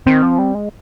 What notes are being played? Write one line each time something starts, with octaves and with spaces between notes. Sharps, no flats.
D#3 C4
F3
G3
G#3